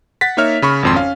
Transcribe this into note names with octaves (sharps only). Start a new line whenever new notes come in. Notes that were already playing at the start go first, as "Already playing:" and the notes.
F#5 A6 B6
A#3 D#4 A#4 C#5 E5 F6
C#3 B5 C#6
G#1 F2 C6
C#4 F5